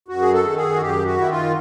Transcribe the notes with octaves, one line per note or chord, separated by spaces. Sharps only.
F#2 F#4
G#4
A4
D#3
G#4
F#4
F#2 G4
F#4
D#3 E4
F4